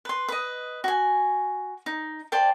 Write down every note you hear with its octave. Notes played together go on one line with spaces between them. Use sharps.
B4 C6
B4 D#5
F#4 G#5
D#4
C5 D5 G5 A5